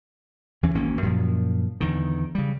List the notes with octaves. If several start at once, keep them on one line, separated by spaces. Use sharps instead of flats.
E2 E3 C#4
G#1 A#3 C#4
F#2 A#2 F3
E2 D3 D#3
C#3 G3